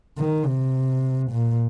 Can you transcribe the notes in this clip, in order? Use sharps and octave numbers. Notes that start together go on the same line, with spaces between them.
D#3
C3
A#2